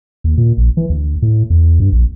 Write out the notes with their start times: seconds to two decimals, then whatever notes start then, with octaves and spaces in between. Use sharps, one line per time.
0.24 D#2
0.37 A#2
0.57 A#1
0.77 E3
0.89 D2
1.22 A2
1.50 E2
1.80 G2
1.92 A#1